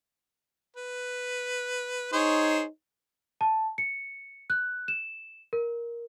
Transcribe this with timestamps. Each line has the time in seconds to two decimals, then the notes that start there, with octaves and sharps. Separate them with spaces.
0.77 B4
2.13 D#4 G#4 C5 C#5
3.41 A5
3.78 C#7
4.50 F#6
4.88 E7
5.53 A#4